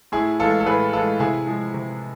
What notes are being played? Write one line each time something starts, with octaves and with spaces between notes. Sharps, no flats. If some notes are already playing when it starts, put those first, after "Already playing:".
A2 E4 G#4
E3 G#3 F4 A4
A4
A2 G#4 B4
E3 G#3 F4 A4
C3 E4 G#4
F3 G#3
C3